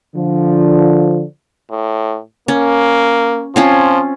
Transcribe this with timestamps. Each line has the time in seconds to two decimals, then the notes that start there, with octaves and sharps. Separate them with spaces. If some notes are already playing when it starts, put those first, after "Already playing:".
0.15 D3 F3
1.71 A2
2.48 A#3 C#4
3.56 F3 C4 C#4 F4